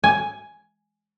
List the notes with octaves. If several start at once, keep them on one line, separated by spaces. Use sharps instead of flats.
G#5